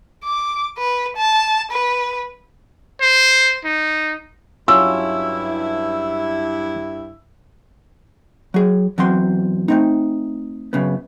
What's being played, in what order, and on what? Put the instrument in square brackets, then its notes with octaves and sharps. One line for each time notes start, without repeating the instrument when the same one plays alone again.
[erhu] D6
B4
A5
B4
[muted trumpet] C5
D#4
[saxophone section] G2 E4 [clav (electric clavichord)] F#3 C#4 F4 [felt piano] E6
[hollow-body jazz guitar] F#3 G#4
E2 F#3 C4 C6
A3 C4 D#4
F#2 C#3 B3